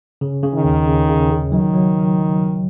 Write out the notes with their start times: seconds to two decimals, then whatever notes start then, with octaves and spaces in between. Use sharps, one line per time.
0.21 C#3
0.43 C#3
0.55 D#3
0.65 D#2
0.87 C#3
1.09 C#3
1.30 C#3
1.52 D#3 F#3
1.74 F#3